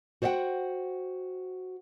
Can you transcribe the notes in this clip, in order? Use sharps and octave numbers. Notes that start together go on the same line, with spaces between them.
F#4 C5 D5 E5 F#5 G5